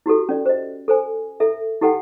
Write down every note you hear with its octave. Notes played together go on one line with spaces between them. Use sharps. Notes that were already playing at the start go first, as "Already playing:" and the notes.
E4 F#4 G4 A4
C#4 D5
C5 D#5
A4 C5 G#5
A4 E5
E4 G4 A4 F#5 G5